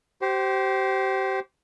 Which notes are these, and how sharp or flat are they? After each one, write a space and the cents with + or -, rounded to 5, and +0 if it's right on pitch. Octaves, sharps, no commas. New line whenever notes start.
G4 -30 C5 +0